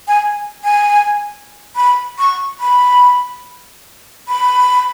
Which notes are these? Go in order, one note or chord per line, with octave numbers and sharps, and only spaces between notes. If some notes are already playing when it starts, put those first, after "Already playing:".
G#5
G#5
B5
C#6
B5
B5